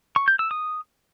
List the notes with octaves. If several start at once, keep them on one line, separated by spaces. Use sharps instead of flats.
C#6
G6
E6
D#6